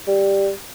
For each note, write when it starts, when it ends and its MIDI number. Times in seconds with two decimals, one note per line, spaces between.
0.07 0.49 55